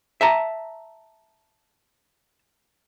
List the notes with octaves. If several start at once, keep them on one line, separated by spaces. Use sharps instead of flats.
E5 A5 A#5